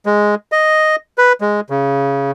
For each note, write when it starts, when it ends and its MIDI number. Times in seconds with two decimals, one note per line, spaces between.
0.06 0.35 56
0.52 0.96 75
1.18 1.33 71
1.41 1.60 56
1.70 2.31 49